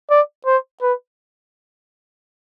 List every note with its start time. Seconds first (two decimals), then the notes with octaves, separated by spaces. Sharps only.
0.10 D5
0.46 C5
0.82 B4